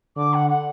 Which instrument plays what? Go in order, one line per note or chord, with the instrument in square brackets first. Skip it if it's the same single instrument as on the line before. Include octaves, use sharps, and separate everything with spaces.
[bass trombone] D3 [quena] D6
[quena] F#5
F#5